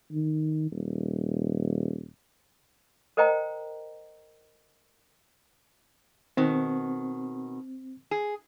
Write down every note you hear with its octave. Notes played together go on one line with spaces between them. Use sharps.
D#3
D#1
A#4 C5 D#5 G5 A#5
B2 D#3 C4
G#4